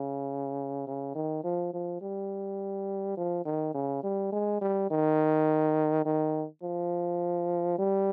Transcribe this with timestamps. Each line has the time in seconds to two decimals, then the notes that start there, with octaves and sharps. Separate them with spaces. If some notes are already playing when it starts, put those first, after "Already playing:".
Already playing: C#3
0.87 C#3
1.15 D#3
1.44 F3
1.74 F3
2.01 G3
3.17 F3
3.45 D#3
3.74 C#3
4.03 G3
4.32 G#3
4.61 G3
4.91 D#3
6.05 D#3
6.63 F3
7.78 G3